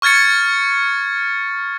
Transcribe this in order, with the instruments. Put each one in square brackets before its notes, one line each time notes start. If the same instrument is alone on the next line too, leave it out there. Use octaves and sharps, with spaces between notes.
[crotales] C#6 F6 G#6 A6 C#7